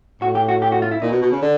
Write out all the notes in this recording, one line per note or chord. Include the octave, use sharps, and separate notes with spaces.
A2 F#4
G4
F#4
G4
F#4
F4
E4
A#2 D#4
B2
B2
C#3
D3